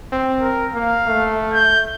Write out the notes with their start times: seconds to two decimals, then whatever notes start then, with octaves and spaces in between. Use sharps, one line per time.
0.12 C4
0.41 A#4
0.74 A#3 F5
1.06 A3
1.53 G6